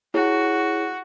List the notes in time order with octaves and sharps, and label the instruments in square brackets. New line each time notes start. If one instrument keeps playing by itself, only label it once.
[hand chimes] E4 G#4 C#5 [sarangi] F#4